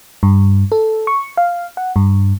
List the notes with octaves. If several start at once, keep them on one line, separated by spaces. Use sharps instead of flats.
G2
A4
C#6
F5
F#5
G2